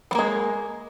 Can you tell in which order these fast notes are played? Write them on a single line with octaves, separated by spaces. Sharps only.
G3 A#3 G#3